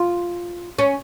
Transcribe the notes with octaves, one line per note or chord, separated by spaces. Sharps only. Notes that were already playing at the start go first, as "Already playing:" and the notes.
Already playing: F4
C#4